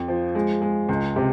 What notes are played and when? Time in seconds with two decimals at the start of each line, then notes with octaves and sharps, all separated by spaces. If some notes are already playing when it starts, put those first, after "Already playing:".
Already playing: F2
0.08 F3
0.35 G#3
0.62 G#3
0.89 C#2
1.16 C3